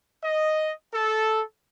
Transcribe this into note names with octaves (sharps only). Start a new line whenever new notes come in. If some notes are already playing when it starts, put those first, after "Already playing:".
D#5
A4